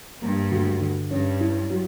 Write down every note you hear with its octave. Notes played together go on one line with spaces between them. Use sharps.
G2 A#3
D2
D3
G2 C#4
E4
F#3